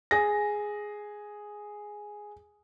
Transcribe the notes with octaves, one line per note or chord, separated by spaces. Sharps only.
G#4 A#6